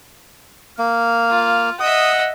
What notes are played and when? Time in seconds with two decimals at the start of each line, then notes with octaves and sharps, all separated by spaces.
0.79 A#3 F6
1.30 F4
1.80 D#5 E5 F#5 D#6